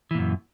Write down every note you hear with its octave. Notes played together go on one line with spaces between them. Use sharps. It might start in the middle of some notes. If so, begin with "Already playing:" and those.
F#2 A#2 E3